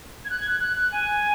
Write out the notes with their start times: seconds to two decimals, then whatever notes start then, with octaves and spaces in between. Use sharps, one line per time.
0.25 G#6
0.30 F#6
0.40 G#6
0.50 F#6
0.60 F#6
0.76 F#6
0.92 G#5